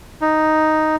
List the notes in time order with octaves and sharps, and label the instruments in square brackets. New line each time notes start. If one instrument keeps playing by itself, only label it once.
[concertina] D#4